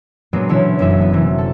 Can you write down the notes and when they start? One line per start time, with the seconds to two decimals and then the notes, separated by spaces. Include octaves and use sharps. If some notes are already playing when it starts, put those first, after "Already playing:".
0.33 A#2 F#3 G#3 B3 C4 D4
0.49 B2 D3 E3 A3 C#4 E4
0.79 F#1 F#2 E3 F#3 E5 E6
1.01 B3
1.13 C3 E3 F#3
1.38 A4